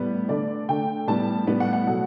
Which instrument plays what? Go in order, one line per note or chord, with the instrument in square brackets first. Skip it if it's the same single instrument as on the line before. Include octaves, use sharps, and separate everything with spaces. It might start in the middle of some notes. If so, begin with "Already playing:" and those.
Already playing: [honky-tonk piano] A2 G3 B3
D3 A3 D5
D3 A3 G5
A2 G3 B3 A5
A2 G3 B3
F#5
F#5
B2 F#3 A3